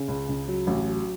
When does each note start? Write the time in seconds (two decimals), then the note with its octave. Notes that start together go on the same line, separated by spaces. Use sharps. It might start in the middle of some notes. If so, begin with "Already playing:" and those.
Already playing: C#3
0.08 C#2
0.29 C#2
0.48 F#3
0.67 A1
0.87 F#3